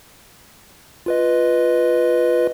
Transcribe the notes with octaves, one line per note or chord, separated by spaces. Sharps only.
F4 B4 D#5